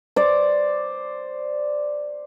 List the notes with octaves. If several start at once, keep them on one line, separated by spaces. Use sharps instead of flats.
C5 D5